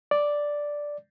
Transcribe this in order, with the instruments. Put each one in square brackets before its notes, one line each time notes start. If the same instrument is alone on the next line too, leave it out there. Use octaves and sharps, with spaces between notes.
[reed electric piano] D5